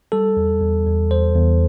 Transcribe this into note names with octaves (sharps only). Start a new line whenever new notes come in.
G3 A4
E2
E2
E2
E2 C5
E2